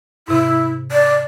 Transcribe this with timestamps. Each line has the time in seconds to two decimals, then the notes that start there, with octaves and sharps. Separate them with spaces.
0.28 G#2 C3 E4
0.92 D5